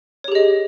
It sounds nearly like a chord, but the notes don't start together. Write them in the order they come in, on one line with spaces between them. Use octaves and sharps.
C#5 G4 G#4 D#5